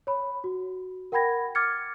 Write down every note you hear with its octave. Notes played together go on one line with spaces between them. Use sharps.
C#5 B5
F#4
A#4 F#5 G5 B5 G#6 A#6
D6 F6 G#6 A6 C#7